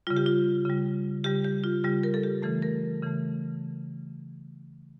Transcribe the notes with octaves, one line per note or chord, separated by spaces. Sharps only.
C#3 G3 F4
G4
F4
C#3 G3
C#3 G3 G4
G4
F4
C#3 G3 G4
A#4
A4
G4
C#3 E3 A3 A4
A#4
C#3 E3 A3